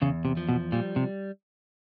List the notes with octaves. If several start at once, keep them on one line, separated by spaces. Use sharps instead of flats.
E2 C#3
C3
F3
B2
A#2 G3
C3